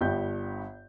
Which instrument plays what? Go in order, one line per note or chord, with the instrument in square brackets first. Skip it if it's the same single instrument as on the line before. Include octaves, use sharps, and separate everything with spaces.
[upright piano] G1 G2 G4 G6